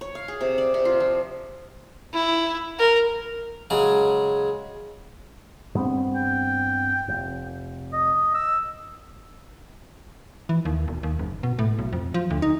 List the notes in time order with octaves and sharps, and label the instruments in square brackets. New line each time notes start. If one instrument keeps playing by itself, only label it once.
[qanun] C#5
F5
G#4
C3
D5
C3
F4
F3
[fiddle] E4
A#4
[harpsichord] C#3 F#3 G#3 G#4
[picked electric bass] G2 B3 C4
[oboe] G5
[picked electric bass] F1
[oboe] D#5
E6
[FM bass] E3
D#2
E1
D#2
F#1
B2
A2
B1
F2
F3
D2
D#4